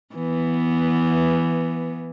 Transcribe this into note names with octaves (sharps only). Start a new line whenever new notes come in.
E3 B3